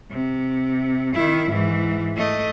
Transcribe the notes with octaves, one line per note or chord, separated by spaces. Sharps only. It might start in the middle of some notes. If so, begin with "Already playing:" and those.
C3
D#3 E4
G#2 E3
A3 D#5